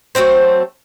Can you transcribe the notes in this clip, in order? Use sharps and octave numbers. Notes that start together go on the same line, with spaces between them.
F#3 A3 C4 C5